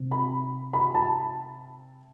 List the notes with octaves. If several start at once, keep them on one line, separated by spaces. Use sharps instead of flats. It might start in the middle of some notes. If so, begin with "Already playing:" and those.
Already playing: C3 C4
B5
B5
A5